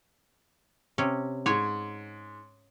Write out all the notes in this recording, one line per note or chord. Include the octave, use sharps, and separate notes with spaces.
C3 C#4
G#2 C#5 G#5